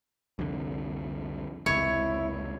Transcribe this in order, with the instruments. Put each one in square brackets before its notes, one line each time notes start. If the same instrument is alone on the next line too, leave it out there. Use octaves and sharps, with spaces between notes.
[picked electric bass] C2 F2 D3
[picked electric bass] F1 C#2 [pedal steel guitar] E4 [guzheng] C#5